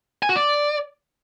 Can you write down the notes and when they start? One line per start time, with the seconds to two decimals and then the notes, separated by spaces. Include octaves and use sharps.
0.23 G#5
0.29 F#4
0.36 D5